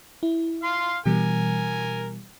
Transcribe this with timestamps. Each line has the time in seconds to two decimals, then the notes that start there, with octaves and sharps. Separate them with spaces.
0.23 E4
0.64 F5 C6
1.06 B2 E3 G3 A#4 G#5